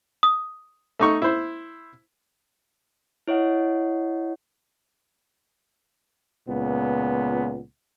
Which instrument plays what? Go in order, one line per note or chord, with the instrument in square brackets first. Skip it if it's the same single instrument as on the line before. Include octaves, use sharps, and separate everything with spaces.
[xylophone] D#6
[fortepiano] A3 D#4 C#6
E4 C5
[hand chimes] E4 C#5 D#5 F#5
[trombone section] C#2 A#2 B3